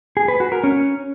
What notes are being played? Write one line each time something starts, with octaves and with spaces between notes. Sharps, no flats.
G#4
B4
F#4
A#4
C#4